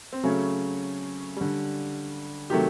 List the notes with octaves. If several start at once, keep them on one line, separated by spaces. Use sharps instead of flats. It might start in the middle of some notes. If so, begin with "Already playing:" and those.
C4
C#3 F#3 A3 C#4
D3 G3
C3 D#3 F#3 A3 G4